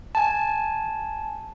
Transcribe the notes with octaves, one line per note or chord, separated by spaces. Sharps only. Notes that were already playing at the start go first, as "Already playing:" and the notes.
G#5 A5